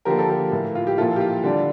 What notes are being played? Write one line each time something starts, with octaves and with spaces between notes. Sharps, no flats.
D3 F3 A#3 G4 A#4
A4
G4 A#4
A2 E3 A#3
F4
G4
A#2 F3 A#3 E4 F4 A4
G4
F4
D3 G3 D4